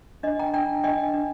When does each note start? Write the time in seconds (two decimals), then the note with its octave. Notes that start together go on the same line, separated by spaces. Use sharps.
0.23 D4 D#5
0.39 G5 A#5
0.53 D4 G5 A#5
0.84 D4 D#5 G5
1.13 D4